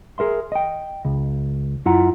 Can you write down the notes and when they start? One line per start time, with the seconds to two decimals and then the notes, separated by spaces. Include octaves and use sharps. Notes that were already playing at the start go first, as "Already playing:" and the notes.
0.18 G#4 A#4 E5 C6
0.52 D#5 G5
1.05 C#2
1.86 F#2 E4 F4 F#5 A#5